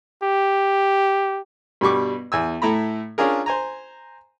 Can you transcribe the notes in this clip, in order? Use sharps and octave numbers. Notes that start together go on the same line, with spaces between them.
G4
G2 B2 G3 C#6 D6
E2 G#5 E6
A2 A3 E4 A#5 B5
C#4 D4 F4 G#4 A#4
C5 G#5 A#5